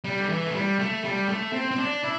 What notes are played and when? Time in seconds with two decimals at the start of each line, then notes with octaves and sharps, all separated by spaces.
0.04 G3
0.20 D3
0.30 E3
0.47 A3
0.55 G3
0.79 A3
1.04 G3
1.29 A3
1.53 C4
1.71 C4
1.78 D4
2.04 E4